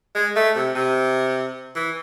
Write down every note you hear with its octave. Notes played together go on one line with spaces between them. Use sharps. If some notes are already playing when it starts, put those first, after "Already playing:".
G#3
A3
C3
C3
E3